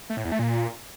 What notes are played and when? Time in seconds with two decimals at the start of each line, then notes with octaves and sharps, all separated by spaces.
0.10 A3
0.17 A2
0.25 E2
0.32 A3
0.39 A#2